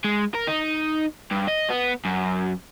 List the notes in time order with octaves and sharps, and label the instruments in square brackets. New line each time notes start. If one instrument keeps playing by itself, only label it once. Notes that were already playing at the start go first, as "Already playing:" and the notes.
[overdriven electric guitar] G#3
A#4
D#4
G2
D#5
B3
F#2